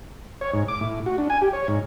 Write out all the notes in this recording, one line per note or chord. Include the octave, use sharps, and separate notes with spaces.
C#5
G#2
D6
A2
F#4
D4
G#5
G4
C#5
G#2